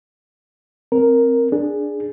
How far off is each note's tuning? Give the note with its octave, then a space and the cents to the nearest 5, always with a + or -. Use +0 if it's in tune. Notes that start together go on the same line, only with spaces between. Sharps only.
C4 +5 A#4 +0
D4 +0 G#4 +0